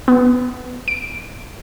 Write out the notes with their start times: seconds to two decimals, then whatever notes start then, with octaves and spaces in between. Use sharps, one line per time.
0.08 B3
0.88 D7